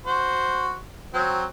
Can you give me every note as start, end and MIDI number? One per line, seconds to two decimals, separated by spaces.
0.06 0.78 66
0.06 0.78 72
1.14 1.44 54
1.14 1.44 60